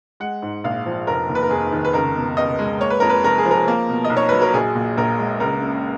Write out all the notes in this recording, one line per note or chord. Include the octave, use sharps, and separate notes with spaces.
G#3 F#5
G#2
A#1 F5
F3
F1 A#4
D#2
B4
A#4
F1 G#4
D#3
B4
C#2 A#4
B2
C#2 D#5
G#3
A#3 C#5
B4
F2 A#4
B4
F1 A#4
G#4
F3
A#4
A#3
B2
D#5
B1
C#5
F#3 B4
A#4
A#1 G#4
A#2
A#1 A#4
G#3
C#2 A#4
C#3